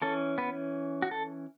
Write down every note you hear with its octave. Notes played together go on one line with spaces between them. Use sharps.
E3 C#4 A4
B3 B4
F#4
A4